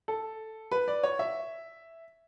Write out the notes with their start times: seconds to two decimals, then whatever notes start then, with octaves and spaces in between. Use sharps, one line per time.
0.08 A4
0.72 B4
0.88 D5
1.03 C#5
1.19 E5